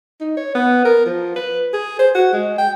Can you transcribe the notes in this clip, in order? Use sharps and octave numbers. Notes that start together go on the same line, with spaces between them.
D#4
C#5
B3
A#4
F3
B4
G#4
C5
F#4
G#3
G5